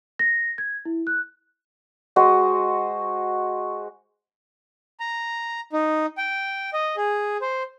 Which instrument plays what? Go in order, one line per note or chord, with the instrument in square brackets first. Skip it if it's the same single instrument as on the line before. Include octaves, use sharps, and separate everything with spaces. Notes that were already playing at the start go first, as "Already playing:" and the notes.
[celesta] A#6
G#6
E4
F#6
[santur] G#3 F#4 C5 D#5
[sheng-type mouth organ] A#5
D#4
G5
D#5
G#4
C5